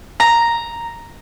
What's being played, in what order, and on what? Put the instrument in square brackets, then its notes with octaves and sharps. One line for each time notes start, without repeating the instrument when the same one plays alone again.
[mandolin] A#5